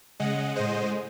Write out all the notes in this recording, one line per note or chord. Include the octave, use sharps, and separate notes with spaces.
C#3 G#3 D#5 F#5
A2 G#3 C5 D#5